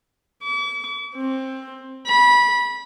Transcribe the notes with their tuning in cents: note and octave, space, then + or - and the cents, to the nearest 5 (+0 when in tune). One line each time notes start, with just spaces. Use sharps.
D6 -45
C4 +15
B5 -20